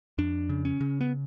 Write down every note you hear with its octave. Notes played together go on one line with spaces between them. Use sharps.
F2 D4
C#3
C#4
C#3
B3